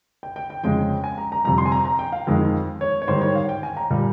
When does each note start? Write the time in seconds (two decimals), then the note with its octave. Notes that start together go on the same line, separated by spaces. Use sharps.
0.23 G5
0.36 G5
0.50 G5
0.64 F2 C#3 G#3 G5
1.04 G#5
1.18 A#5
1.32 A#5
1.44 F2 C3 G3 A#5
1.58 C6
1.66 G#5
1.72 A#5
1.85 A#5
1.99 G5
2.12 F5
2.27 F2 D#3 G#3
2.81 C#5
3.02 C#5
3.07 G#2 D#3 G3 C5
3.22 C#5
3.35 F5
3.49 G5
3.63 G#5
3.77 A#5
3.90 A#2 G3